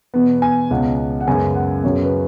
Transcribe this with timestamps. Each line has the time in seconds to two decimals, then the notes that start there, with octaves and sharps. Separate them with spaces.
0.14 E2 B2 B3
0.42 G#5
0.71 C#2 B2 B3 F#5
1.21 F#5
1.27 F#2 C#3 G#3 B3 G#5
1.55 F#5
1.83 F#2 C#3 F#3 B3 C#5
2.03 B4